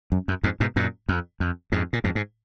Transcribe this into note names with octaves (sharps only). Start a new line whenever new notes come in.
F#2
F#2
F2 G#2
G#2 B2
F#2 A#2
F2
F2
F2 G#2
A#2
F2 G#2
G#2